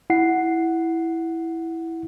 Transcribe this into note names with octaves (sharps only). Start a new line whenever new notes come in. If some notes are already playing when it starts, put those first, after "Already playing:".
E4 F#5 C7